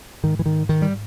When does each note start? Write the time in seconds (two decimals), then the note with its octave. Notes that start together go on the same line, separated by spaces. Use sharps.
0.23 G#2 D#3
0.39 E3
0.46 D#3
0.69 D#3
0.82 G3